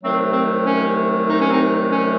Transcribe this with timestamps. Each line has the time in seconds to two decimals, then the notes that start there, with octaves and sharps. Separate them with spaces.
0.04 C2 C3 D#3 F#3 A3 C4
0.31 C4
0.66 C#4
1.29 D#4
1.40 C#4
1.50 C4 D#4
1.92 C#4